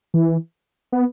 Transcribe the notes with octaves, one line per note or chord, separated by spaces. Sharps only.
E3
B3